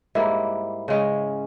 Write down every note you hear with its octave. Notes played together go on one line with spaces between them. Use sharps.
G#2 G3 A#3 E4
C#3 G#3 C#4